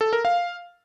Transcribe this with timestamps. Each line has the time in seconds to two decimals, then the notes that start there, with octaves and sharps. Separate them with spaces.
0.01 A4
0.13 A#4
0.25 F5